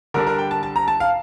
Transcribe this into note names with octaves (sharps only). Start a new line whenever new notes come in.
D3 G3 D4 A#4
A#4
G5
A5
A5
A#5
A5
F5